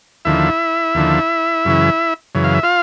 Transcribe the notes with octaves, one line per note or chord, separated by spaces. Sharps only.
D#2 D3 F3 E4 E5
D#2 D3 F3
F#2 C#3 E3
F#2 C#3 E3
F5
E5
F4 F5